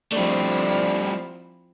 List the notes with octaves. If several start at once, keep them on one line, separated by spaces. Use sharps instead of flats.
F3 G3 A3 C4 D4 E4